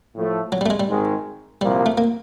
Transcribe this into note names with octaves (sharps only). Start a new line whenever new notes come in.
A2 F3 A3
F#3
G3
A3
G#3
G3
G#1 G#2 D#3 G#3
C2 A#2 F3 G3 A#3
A3
A#3